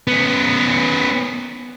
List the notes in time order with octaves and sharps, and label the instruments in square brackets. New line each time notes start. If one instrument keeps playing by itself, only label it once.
[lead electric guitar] B3 C#4